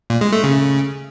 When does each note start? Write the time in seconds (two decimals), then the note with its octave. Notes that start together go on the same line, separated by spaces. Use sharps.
0.10 A#2
0.21 G#3
0.32 A3
0.44 C#3